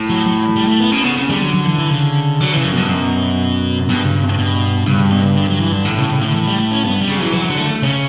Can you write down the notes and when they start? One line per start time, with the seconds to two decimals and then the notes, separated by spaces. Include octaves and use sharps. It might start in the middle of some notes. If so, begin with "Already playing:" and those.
Already playing: A2
0.10 F#3
0.26 F#3
0.56 G3
0.68 A3
0.80 B3
0.92 B2 C#4
1.04 C#3 B3
1.17 C#3
1.29 D3 G3
1.42 F#3
1.54 F#3
1.67 E3
1.78 E3
1.90 C#3
2.41 D3 F#3
2.53 C#3 E3
2.64 F#2
2.73 G2 B2
2.89 F#2
3.89 G2 B2
4.05 C#3
4.38 B2
4.86 G2 C#3
4.99 C#3
5.12 B2
5.23 C#3
5.36 D3
5.48 F#3
5.60 E3
5.73 D3
5.85 A2
5.98 C#3
6.10 C#3
6.22 D3
6.34 E3
6.47 G3
6.60 A3
6.71 C#4
6.84 G2 B3
7.01 G3
7.09 C#3
7.17 E3 F#3
7.33 E3 F#3
7.45 E3
7.50 D3
7.57 A3
7.83 C#3 C#4